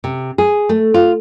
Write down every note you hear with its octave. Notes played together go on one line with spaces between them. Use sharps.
C3
G#4
A3
F4